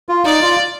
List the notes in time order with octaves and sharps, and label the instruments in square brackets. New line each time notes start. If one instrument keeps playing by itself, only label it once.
[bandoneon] F4
[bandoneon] D#4 [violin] D5
[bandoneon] F4